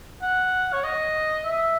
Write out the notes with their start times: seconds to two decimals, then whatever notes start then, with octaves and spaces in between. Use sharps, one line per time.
0.22 F#5
0.73 C#5
0.84 D#5
1.44 E5